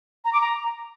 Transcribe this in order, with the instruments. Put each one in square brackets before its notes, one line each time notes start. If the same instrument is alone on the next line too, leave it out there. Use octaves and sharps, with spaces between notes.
[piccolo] A#5
D6
A#5